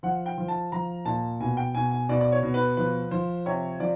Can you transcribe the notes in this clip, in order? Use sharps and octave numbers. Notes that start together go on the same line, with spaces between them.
F3 F#5
G5
F3
A5
F3 A#5
A#2 A5
B2 G#5
G5
B2 G#5
G#5
B2 D5
D5
C#5
B2
B4
F3 B4
F3 C5
C3 C#5
F3 D5